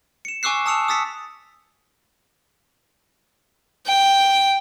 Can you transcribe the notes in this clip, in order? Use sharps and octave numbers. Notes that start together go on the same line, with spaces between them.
C#7 E7
G#5 C#6 D6 E6 F#6 C7
A5 D#6 E6 C#7 F7
D#6 E6 A6 B6 C#7
G5